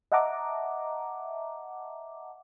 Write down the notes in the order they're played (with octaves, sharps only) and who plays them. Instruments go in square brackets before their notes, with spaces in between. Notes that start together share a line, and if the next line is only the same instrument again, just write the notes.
[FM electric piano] D#5 E5 F#5 A5 A#5 D6